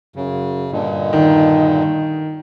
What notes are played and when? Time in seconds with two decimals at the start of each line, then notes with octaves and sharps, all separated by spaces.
0.16 F#2 C#3
0.72 G2 A#2 D3 D#5
1.13 D#3